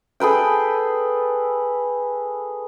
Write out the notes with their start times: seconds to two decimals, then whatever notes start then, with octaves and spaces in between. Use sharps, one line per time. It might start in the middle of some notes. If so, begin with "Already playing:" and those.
0.20 G#4 A4 B4 G5